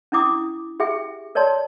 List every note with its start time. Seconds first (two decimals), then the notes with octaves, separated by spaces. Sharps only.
0.12 C#4 D4 E4 D6 D#6
0.80 G4 G#4 E5 G5
1.35 A#4 C#5 D5 A5 C6